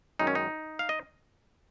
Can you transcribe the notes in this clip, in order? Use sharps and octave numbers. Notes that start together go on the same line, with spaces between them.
F#2 D#3 G#3 D#4
C#4
D#4
F5
D#5